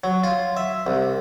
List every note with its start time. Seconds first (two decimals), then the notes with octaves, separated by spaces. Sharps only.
0.04 F#3
0.24 F4
0.57 E5
0.87 C2